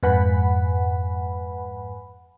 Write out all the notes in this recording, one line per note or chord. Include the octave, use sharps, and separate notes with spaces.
F2 G#2 B4 F#5 G#5 B5